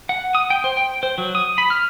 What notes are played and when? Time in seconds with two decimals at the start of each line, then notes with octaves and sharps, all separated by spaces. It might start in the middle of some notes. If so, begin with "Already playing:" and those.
0.09 F#5
0.35 D#6
0.50 G5
0.64 C5
0.77 G5
1.03 C5
1.18 F#3
1.35 D#6
1.58 B5
1.70 F6